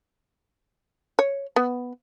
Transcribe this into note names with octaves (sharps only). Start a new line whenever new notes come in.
C#5
B3